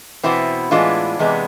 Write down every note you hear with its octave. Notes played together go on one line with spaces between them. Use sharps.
E2 B2 B3 C4 E4
A2 E3 G#3 B3 D4 F4
E2 C3 G#3 B3